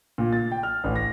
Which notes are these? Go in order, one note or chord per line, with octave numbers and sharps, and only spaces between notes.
A#2
A6
G5
F6
A1
A#6